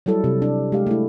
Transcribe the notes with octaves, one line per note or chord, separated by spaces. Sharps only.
F#3 G3 E4 A4
C3
D4
G#3 G4 F5
A3 E4